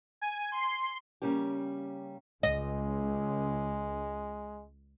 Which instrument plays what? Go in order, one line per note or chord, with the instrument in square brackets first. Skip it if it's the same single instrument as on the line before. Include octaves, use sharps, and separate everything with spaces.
[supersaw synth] G#5
C6
[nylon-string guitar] C#3 G3 A#3 C#4 G4
[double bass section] C#2 [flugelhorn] G#3 [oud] D#5